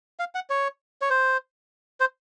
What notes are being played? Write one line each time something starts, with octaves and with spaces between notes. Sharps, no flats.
F5
F#5
C#5
C#5
C5
C5